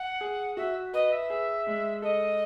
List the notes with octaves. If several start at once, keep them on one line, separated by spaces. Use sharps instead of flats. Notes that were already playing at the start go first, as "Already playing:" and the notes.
Already playing: F#5
G#4
F#4 E5
B4 D#5
E5
G#4
G#3
A4 D#5